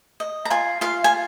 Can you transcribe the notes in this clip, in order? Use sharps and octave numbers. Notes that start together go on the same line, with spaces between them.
D#5
A#5
F4 G#5
F4 F5
G#5